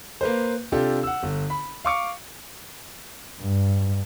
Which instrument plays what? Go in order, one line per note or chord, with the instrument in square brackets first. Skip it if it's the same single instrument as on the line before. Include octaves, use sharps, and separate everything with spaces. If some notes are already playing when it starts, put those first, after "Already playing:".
[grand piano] A#3 B4 C5
C3 D4 F4 G4 A4
F#5 E6
G1
B5
F5 C#6 D6 C#7
[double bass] G2